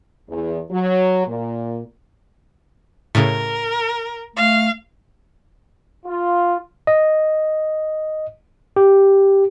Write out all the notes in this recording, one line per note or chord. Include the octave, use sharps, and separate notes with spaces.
E2
F#3
A#2
A2 C#3 A#4
A3 F5
F4
D#5
G4